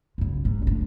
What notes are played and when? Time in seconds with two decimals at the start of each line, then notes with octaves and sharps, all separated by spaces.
0.18 F#2 C#3
0.45 G#2
0.63 F1 D4